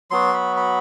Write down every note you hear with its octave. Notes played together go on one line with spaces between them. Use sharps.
F#3 B3 F#4 C6
B5
B5